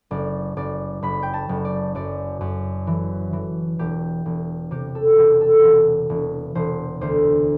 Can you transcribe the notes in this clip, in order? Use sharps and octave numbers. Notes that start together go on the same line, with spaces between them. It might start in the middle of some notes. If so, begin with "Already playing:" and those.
F#1 D5
F#1 D5
F#1 B5
G5
A5
F#1
D5
F#2 D5
F#2
E3
E3
E1 G4
E1
C3 G4
A4
E1 G4
A4
E1
E1
E1 C5
D2 C5